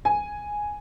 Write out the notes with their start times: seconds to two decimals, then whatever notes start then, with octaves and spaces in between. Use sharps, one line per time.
0.05 G#5